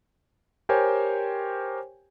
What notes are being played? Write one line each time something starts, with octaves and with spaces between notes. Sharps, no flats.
G4 A#4 C5 C#5 G5 G#5